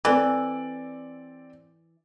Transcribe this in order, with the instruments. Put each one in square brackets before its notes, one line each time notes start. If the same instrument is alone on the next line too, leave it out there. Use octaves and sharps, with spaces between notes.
[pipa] E3 [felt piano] C4 A4 D5